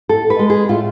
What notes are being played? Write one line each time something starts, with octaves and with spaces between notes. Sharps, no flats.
A2 A4
B4
G#3
G#4
A2 F4